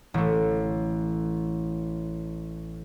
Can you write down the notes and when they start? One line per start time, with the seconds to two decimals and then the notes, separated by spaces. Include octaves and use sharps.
0.14 A1 A3